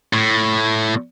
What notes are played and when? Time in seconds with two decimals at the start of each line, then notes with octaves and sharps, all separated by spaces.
0.13 A2